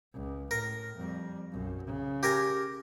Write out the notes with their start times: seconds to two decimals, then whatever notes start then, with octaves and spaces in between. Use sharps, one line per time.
0.13 C#2
0.51 A2 A#4
0.97 F2 G3
1.52 B1 F#2
1.86 C#3
2.23 G4 A#4 G#5